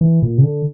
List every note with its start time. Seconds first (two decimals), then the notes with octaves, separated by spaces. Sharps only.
0.01 E3
0.22 A#2
0.38 C#3
0.43 D3